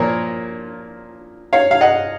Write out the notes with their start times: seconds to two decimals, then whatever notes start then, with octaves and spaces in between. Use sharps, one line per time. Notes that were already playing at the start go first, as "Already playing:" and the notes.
Already playing: A#2 F3 A#4 C#5
1.53 C#5 F5
1.71 F5
1.81 D#5 F#5